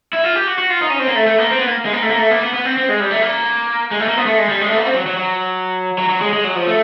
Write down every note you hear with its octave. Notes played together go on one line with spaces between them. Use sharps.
E4
F4
G4
F#4
F#4
F4
D#4
C#4
C4
A#3
A3
A3
A#3
C4
B3
A#3
G#3
A#3
A3
A#3
A3
A#3
B3
B3
C4
C4
G#3
G3
A3
A#3
G#3
A3
A#3
B3
A3
G#3
G3
G#3
A3
A#3
C4
F#3
F#3
F#3
F#3
F#3
G#3
G#3
F#3
F3
A3